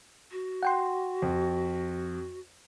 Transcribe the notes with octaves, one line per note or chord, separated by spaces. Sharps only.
F#4
F#5 G5 C6
F2